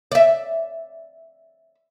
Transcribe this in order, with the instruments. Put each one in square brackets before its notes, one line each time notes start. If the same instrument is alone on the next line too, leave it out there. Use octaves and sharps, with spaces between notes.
[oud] D5 E5